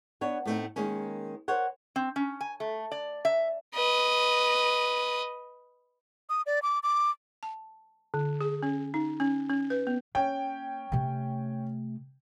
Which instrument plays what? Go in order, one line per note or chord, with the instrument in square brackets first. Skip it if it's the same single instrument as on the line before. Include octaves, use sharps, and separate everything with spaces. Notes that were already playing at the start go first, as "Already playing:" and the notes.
[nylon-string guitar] B3 D4 C#5
A2 A3 C4 D#4
D#3 G#3 A#3 C#4
A#4 C5 C#5 F#5
[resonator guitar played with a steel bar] C4
C#4
G#5
A3
D5
E5
[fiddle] B4 D#5
[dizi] D#6
D5
D6
D6
[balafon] A5
D3
G#4
C#4
D#4
C#4
C#4
B4
B3
[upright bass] A#3 [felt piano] C#4 G5
[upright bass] C3 A3